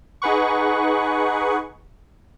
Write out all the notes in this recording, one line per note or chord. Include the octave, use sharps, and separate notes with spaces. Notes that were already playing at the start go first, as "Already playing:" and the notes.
D#4 G#4 B4 F#5 C#6